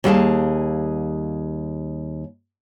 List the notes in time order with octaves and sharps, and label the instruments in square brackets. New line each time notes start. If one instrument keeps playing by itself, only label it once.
[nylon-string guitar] D#2 G3 G#4 E5 F5 A5